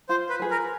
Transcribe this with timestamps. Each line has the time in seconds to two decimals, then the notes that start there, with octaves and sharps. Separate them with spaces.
0.09 F4 C5
0.29 B4
0.40 G#4 B4
0.51 A#4